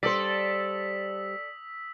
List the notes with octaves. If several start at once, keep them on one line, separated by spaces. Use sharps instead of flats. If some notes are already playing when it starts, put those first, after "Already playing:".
G3 A4 C5 D5 D#6 E6 B6